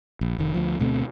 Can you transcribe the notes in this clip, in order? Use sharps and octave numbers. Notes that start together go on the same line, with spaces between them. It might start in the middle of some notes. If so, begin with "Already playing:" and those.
A#1
F1 D#3
D2 F3
D2 B2 A3 C4